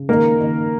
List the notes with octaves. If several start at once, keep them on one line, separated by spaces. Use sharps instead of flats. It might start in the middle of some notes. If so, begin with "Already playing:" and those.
Already playing: C#3
D#3 A#3 A#4
D#3